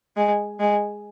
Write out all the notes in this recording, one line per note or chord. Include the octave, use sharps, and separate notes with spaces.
G#3
G#3